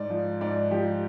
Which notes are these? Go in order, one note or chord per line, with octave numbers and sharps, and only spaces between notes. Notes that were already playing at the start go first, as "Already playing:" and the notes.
Already playing: G#2 D5
F3
G#2 D5
F3 G4